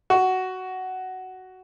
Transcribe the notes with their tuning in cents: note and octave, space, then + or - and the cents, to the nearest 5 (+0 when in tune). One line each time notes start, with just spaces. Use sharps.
F#4 +10